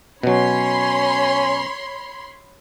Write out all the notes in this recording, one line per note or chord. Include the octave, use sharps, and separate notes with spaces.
B2 F#3 C#4 C#5 B5 C6